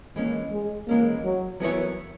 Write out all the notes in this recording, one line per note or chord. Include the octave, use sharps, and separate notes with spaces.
E3 G#3 A#3 C#4
G#3
E3 G#3 A#3 C#4
F#3
E3 F#3 B3 E4 A#4 C#5